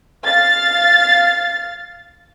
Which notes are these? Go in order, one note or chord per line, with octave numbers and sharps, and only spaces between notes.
F5 A6